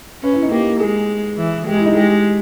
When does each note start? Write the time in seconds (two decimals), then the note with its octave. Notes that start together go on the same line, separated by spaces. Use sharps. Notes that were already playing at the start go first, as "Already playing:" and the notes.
0.23 C#4 B4
0.33 E4
0.42 D#4
0.51 A#3 G4
0.80 G#3 G#4
1.38 E3
1.67 G#3 G4
1.77 E4
1.86 D#4
1.96 G#3 G4